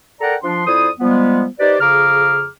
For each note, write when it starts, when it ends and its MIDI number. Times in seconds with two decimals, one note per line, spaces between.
0.21 0.35 69
0.21 0.35 70
0.21 0.35 74
0.21 0.35 78
0.21 0.35 79
0.21 0.35 82
0.43 0.64 53
0.43 0.64 62
0.43 0.64 84
0.66 0.89 41
0.66 0.89 64
0.66 0.89 72
0.66 0.89 74
0.66 0.89 87
1.00 1.45 53
1.00 1.45 55
1.00 1.45 56
1.00 1.45 59
1.60 1.76 63
1.60 1.76 67
1.60 1.76 71
1.60 1.76 72
1.60 1.76 74
1.81 2.47 41
1.81 2.47 49
1.81 2.47 68
1.81 2.47 82
1.81 2.47 86
1.81 2.47 89